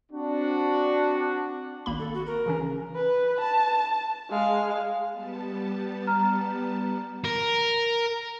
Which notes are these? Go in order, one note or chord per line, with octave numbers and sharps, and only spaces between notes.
C4 D4 F#4
G#1 A#3 B5
A4
F#4
A#4
C#3 E3 C#4
B4
A5
G#3 F5
G3 B3 A5
A#5 F6
A#4